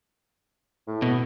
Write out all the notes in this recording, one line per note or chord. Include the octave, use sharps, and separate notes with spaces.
A2
B2